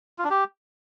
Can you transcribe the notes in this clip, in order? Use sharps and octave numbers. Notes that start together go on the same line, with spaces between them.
F4
D4
G4